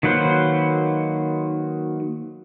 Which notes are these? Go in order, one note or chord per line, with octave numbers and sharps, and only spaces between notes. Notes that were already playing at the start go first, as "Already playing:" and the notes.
D#3 F#3 A#3 B4 C5